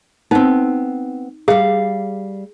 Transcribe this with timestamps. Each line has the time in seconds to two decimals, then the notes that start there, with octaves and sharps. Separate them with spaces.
0.31 B3 C4 D#4
1.48 G3 G#4 F5